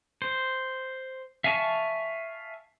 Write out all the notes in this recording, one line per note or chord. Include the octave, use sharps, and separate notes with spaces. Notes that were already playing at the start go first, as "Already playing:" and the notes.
C5
E5 F5 G#5 A5 C#6